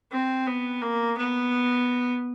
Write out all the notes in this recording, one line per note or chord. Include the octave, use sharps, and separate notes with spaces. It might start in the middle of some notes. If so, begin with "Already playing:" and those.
C4
B3
A#3
B3